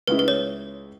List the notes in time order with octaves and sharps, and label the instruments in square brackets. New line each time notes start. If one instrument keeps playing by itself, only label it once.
[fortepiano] C#2 C#3 G#3 E4 [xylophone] B4
[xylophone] B4
C#5